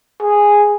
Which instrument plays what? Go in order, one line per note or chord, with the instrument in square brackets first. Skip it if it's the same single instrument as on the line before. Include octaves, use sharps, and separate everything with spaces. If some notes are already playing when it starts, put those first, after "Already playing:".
[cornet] G#4